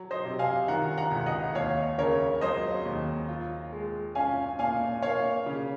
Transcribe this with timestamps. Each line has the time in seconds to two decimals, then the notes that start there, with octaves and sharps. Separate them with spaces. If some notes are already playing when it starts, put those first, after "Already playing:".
Already playing: F#3
0.11 C5 D#5
0.25 C3
0.39 F5 G#5
0.68 D#3 F#5 A#5
0.97 F#5 A#5
1.11 C#2
1.26 D#5 F#5
1.55 D#2 C#5 F5
1.98 C#3 A#4 C#5
2.41 F#3 C5 D#5
2.85 D#2
3.29 F4
3.73 G#3
4.15 C#4 F5 G#5
4.59 A#2 F5 G#5
5.02 A#3 C#5 F5
5.46 C#3